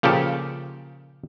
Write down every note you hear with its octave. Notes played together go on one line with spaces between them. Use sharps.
A#2 C#3 F3 G4 A4